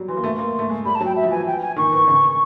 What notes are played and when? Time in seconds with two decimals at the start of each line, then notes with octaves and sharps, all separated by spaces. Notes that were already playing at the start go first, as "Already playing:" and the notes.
Already playing: F#3 G3
0.08 E3 C6
0.17 A#3
0.24 A3
0.39 A#3
0.59 A3
0.70 G#3
0.85 G3 B5
0.95 A5
1.01 F#3
1.05 G5
1.16 E5
1.23 F3
1.31 E3 G#5
1.47 G5
1.61 G#5
1.76 D#3 C#6
1.92 E3
2.07 C#3